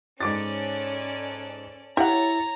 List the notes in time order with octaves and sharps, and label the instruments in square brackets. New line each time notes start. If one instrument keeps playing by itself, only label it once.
[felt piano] G#2 D6 A6 [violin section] C#4 A4 D5
[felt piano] E4 [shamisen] G4 F#5 [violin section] C#5 A6 [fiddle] A#5